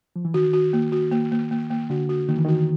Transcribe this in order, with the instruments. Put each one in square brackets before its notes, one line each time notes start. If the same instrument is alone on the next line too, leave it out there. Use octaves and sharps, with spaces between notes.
[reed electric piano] F3
E3
[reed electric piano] D#3 [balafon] F#4
[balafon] F#4
A#3
F#4
A#3
A#3
A#3
A#3
[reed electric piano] D3 [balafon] F#4
[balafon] F#4
[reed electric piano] D#3 [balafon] A#3
[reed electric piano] E3
[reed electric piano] D#3 [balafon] F#4